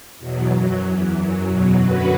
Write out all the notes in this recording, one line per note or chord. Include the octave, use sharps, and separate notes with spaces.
E2 B2 F#3
F#2 F#3
E2 E3
F#2 F#3
E2 B2 F#3
F#2 D3 F#3 F#4 B4